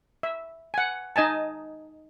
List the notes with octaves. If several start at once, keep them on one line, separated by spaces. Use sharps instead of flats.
E5
F#5 G#5
D#4 D#5 G#5 A5